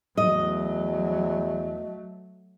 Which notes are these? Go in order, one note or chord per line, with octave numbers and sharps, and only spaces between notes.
E2 F#3 A3 D#5